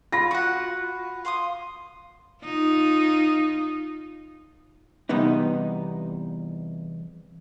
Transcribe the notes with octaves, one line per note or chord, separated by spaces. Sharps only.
F4 B5 A#6
F#4 F#5
F5 C6 D#6
D#4 F4
E2 C3 G3 B3 D#4